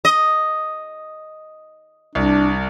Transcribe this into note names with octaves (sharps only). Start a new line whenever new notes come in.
D#5
C2 D4